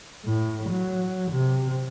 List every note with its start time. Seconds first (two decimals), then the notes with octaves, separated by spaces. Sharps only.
0.25 A2
0.69 F#3
1.32 C3